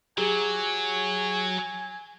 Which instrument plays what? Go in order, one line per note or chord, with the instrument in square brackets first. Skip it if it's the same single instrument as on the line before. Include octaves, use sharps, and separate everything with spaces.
[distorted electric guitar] F#3 [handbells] G4 G#4 [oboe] G#5